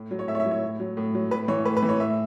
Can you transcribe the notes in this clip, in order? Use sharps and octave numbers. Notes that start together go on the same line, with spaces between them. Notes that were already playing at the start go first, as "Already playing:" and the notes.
Already playing: A2
F#3
C#5
A2 E5
C#5
E5
F#3
C#5
A2
F#3
A2
F#3
A2 B4
E3 C#5
A2 B4
B4
E3
C#5
A2 E5